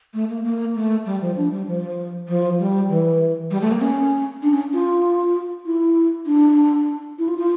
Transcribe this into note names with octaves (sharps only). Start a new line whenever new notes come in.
A3
A#3
A#3
A3
G3
F3
D4
G3
F3
F3
G3
E3
G3
A3
A#3
C#4
D4
C#4
F4
E4
D4
E4
F4
F4